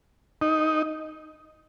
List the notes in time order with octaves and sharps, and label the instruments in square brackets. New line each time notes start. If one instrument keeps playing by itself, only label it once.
[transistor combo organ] D#4